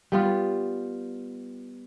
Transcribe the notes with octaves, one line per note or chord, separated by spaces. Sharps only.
G3 B3 F4